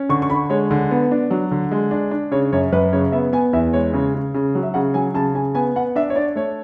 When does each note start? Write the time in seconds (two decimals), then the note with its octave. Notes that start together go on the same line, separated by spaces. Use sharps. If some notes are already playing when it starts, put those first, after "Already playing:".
Already playing: C#4
0.09 D3 C#6
0.22 C#6
0.30 D3 B5
0.50 G#3 C#5
0.71 D3
0.91 B3
1.11 D4
1.30 F#3
1.51 D3
1.71 G#3
1.91 D4
2.11 D4
2.31 C#3 C#5
2.52 F#2 C#5
2.72 F#2 B4
2.93 C#3 C#5
3.12 B3 E5
3.32 B3 G#5
3.53 E2 E5
3.73 G#3 C#5
3.93 C#3
4.14 C#3
4.34 C#3
4.55 F#3
4.63 E5
4.74 C#3 F#5
4.94 F#3 G#5
5.14 C#3 A5
5.35 C#3 G#5
5.55 B3 G#5
5.75 B3 F#5
5.96 D4 E5
6.10 C#5
6.15 D4 D5
6.35 A3 C#5